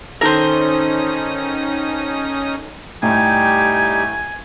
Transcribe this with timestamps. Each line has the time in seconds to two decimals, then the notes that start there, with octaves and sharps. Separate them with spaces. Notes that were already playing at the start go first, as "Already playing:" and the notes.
0.21 D#3 C#4 D#4 A4 A#4 C5 D#6
3.03 A2 G3 D#4 G4 G#5